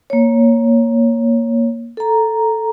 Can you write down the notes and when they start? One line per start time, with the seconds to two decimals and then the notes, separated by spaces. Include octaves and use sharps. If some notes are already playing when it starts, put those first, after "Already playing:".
0.10 A#3 C#5
1.97 A4 A#5